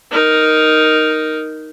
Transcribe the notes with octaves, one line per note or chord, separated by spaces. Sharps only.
D#4 A#4